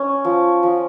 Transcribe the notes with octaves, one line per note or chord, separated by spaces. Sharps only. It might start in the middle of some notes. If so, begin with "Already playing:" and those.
Already playing: C#4
F3
F3